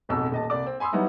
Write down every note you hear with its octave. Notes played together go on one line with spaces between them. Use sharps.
D1 B1 F2 B2 E6
D#1 D#5 A5
C2 D5 D6
C4
G#5 B5 C6 D#6 E6
F#3 G3 B3 D#4 E4